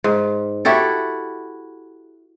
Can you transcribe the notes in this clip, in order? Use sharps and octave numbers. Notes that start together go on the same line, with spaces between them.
G#2
E4 F#4 G4 A4